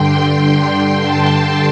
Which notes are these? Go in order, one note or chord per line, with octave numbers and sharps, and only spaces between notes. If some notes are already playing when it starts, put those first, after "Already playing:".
Already playing: G2 D3 G5 C6
A5